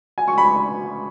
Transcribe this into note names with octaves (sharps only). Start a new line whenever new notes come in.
G#5
C#6
B5